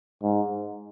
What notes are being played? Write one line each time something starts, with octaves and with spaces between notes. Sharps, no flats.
G#2